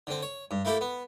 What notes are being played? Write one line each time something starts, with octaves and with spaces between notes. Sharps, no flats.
D3 C4
C#5
G2
A3 A#3 E4 G4 A4
B3